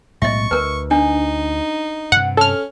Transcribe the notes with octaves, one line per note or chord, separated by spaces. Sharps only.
B1 A2 G#3 D#5 E5 C#6
D2 A#4 B4
D4 D#4
G2 C3 F#5
C#4 A4 F6